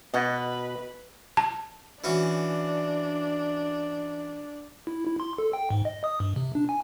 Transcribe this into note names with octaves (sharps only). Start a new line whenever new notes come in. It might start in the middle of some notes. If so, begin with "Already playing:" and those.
B2 F#4 B4 D#5
A5
E3 C#4 D4 F#4
E4
E4
C6
A4
G5
G#2
D#5
D#6
G2
C3
D4
G#5